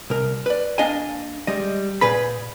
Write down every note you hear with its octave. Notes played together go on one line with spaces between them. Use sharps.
C2 A#4
B4 D5
A#3 D4 D#5 F5 G#5
G3 G#3 D#5
A#2 G#4 B4 B5